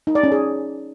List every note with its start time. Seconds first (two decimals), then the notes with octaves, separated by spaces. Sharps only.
0.07 D#4
0.15 D5
0.23 C#4
0.32 G#4